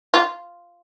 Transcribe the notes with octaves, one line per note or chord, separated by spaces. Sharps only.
F4